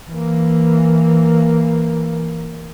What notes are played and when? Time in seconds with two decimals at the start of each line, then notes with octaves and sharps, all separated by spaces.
0.10 E3 A#3